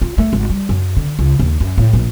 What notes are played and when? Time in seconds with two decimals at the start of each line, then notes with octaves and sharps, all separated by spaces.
0.02 F4
0.18 A3
0.33 G#1
0.50 G3
0.69 F#2
0.97 D3
1.19 C#2
1.40 D#2
1.60 F#2
1.78 A2
1.93 A#1